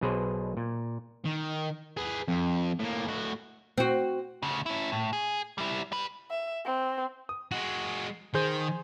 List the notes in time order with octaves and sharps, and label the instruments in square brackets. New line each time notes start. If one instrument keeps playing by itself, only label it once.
[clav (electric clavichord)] B1 B2 G#4 B4 C5
A#2
[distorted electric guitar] D#3
G#4 B4
F2
A2 A#3
A2 F#4
[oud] C4 F#4
[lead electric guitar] D2 C#3
C#4 E4
A2
G#4
G3 E4
G3 B4
[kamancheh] E5
C4
[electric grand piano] D#6
[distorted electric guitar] G#3 F#4
[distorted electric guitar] D#3 [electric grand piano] G#4 C5 G6